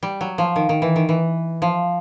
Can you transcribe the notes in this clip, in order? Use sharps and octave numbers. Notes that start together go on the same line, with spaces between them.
G3
F#3
F3
D#3
D#3
E3
D#3
E3
F3